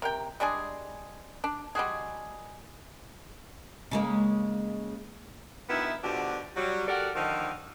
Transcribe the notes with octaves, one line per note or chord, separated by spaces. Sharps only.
C3 A#4 G5
G3 G#3 D4 G#4
D4
G3 G#3 F#4 G#4
C#3 G#3 A#3
D2 D#3 B3 E4 E5
B2 D3 F3 D4 F#4 G4
F#3 G3
F#4 G4 A4 A#4 D5 F#5
D3 D#3 F3